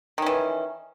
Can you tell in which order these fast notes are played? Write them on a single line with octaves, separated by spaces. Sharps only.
D#3 C#4 E3